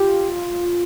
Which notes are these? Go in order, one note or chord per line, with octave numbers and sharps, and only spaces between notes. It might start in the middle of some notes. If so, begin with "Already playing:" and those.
Already playing: F4 G4